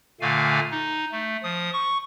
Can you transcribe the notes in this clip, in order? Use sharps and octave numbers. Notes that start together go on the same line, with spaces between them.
A#2 D3 A3 F5 G#5
D#4
A3
F3 D#6
C#6